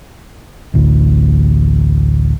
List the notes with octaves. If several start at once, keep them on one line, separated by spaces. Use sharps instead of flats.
A1 D2